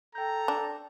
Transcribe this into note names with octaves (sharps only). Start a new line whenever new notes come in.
A4 G5 A#5 G6
D4